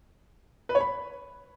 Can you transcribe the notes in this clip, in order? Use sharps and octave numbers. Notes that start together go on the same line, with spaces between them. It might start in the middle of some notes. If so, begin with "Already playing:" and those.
B4
C#5
B5